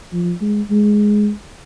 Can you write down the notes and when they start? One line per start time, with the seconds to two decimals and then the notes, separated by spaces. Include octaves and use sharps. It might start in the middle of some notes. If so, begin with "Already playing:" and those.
0.13 F3
0.41 G#3
0.71 G#3